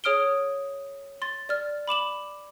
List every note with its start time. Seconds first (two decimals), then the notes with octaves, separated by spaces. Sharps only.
0.04 G#4 C#5 D#6 F6 D7 G7
1.22 C6 A6
1.49 D5 F6
1.88 B5 D6 E7 F#7